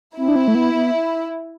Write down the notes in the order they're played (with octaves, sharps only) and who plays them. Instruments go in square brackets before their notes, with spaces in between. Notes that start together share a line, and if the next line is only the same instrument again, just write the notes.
[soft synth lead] C4 [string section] E4
[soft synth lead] D4
C4
A3
B3
B3